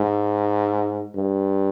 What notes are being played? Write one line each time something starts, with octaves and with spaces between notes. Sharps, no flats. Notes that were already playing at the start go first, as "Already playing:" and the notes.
Already playing: G#2
G2